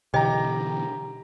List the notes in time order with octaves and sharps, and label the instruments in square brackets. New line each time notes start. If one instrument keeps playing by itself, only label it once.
[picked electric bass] B2 D3 E3 [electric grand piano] G4 A#5 [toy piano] D#5 G5